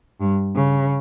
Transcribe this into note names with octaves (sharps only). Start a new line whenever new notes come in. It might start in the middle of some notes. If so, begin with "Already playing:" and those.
G2
C#3